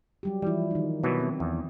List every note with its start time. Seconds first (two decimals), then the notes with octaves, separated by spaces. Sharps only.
0.23 F#3 G3 G4
0.42 E3 F3 G3 E4
0.71 D#3 D#4
1.04 B2 E3 F#3
1.20 C4
1.40 E2